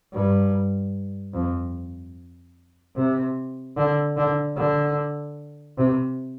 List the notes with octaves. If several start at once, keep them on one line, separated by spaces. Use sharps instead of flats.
G2
F2
C3
D3
D3
D3
C3